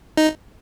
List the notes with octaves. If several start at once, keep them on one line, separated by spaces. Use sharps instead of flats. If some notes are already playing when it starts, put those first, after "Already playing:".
D#4